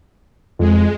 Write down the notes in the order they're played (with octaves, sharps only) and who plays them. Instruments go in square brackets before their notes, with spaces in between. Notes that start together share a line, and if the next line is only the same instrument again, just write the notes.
[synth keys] F2 [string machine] G#3